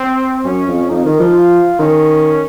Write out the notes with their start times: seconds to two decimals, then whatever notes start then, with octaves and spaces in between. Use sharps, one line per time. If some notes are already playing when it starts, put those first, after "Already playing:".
Already playing: C4
0.45 F#2 C#4
0.68 F2
0.90 F2 D#4
1.05 D#3
1.20 F3
1.35 F4
1.79 D#3 C#4